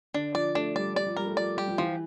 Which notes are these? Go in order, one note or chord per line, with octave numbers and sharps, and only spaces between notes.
D3 D4
F3 D5
A3 D4
G3 D5
G3 D5
F3
G3 A#4
A3
F3 D5
G3 G4
F3
E3 F3